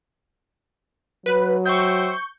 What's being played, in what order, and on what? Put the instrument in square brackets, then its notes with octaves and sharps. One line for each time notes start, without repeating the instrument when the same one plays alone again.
[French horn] F#3 [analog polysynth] B4
[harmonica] C5 E5 G5 [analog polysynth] C#6 G6